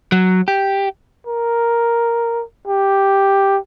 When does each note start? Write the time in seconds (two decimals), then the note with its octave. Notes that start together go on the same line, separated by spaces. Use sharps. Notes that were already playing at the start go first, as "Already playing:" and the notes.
0.12 F#3
0.48 G4
1.27 A#4
2.67 G4